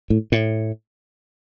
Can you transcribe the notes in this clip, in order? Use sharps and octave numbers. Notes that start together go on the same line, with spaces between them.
A2
A2